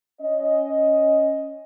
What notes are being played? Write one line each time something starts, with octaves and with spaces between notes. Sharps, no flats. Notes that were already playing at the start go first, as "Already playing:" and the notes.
C#4 D#5